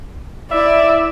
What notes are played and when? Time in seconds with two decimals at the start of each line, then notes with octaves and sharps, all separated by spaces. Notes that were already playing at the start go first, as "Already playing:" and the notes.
0.51 E4 D5 E5